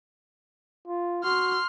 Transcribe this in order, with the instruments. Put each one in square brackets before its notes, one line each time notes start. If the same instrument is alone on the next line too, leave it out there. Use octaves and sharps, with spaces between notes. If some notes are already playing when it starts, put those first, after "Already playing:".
[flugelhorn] F4
[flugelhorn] F#4 [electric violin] C6 F6